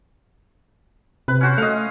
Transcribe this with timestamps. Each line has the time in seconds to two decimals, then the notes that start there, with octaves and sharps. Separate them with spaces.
1.28 C3 B4
1.41 C#4 F#4 C5
1.58 A3 D#5 F5